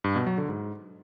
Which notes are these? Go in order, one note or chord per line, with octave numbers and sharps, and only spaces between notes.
G2
B2
F#3
D3
G#2